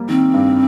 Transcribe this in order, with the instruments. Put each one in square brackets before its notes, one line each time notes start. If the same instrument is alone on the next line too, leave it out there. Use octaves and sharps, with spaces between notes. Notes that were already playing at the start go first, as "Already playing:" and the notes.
Already playing: [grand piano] G3 A#3
[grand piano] D#3 [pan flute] C4
[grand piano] G2